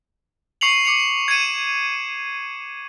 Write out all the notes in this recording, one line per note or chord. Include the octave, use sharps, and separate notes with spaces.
C#6 C7 C#7 F7 F#7
D6 C#7 F7
G#6 C#7 D#7 E7